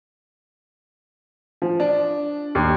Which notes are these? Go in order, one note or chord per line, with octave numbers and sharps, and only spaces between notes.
F3
D4
D#2